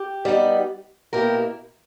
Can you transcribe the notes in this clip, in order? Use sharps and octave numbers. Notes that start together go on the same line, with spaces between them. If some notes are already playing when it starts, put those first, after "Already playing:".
Already playing: G4
G3 B3 D#4
B2 A#3 E4 G4 A#4